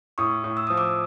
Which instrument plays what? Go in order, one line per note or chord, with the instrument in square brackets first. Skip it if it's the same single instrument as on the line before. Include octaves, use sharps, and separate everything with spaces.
[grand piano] A2 [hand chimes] C#6 D#6
[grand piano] A2
[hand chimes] E6
[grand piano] F3 [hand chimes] D#6
[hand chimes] D6 E6